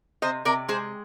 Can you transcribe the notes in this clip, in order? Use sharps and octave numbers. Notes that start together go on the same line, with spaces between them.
C3 C5 D#5
C3 A#4 D5
G#3 G#4 C5